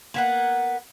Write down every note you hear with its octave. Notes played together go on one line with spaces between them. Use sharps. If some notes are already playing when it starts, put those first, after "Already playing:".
A#3 B3 F#5